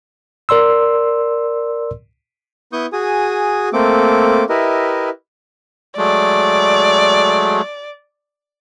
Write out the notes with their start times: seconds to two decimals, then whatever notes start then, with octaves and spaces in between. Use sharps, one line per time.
0.49 A#4 D5 C6 E6
2.73 B3 E4 C#6 D#6 G6
2.93 F#4 G#4 G#5 D#6
3.73 A3 A#3 C4 A4 D6
4.49 E4 G4 A#4 B4 D#5 E5
5.98 F#3 G#3 A3 D5